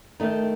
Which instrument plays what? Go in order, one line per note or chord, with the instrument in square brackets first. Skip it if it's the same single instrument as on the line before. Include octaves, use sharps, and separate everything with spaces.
[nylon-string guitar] D#3 A3 D#4